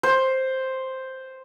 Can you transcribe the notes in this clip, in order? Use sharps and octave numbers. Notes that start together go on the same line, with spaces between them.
C5